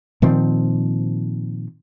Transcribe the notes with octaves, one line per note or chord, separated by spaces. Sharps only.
A#2 D#3 F3 C4